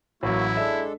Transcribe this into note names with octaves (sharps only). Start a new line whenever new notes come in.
A1 F#3 A#3 E4 F#4
G#3 D4 A4 E5